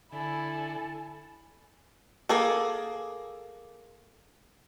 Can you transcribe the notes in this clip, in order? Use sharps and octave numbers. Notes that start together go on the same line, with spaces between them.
D3 E4 A4 G#5
A#3 G#4 A4